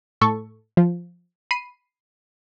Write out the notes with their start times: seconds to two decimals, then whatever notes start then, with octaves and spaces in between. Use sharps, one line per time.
0.21 A2 A4 C#6
0.77 F3
1.51 B5 C7 D#7